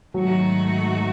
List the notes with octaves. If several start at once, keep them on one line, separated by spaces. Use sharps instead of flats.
G#2 D#3 F#3 A3 D#4 F#4